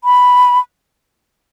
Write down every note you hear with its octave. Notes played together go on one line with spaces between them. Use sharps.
B5